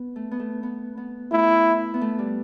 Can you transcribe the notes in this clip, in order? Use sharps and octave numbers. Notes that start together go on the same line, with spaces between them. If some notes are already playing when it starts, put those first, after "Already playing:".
Already playing: B3
A3
B3
A3
B3
B3
A3 E4
B3
A3
G3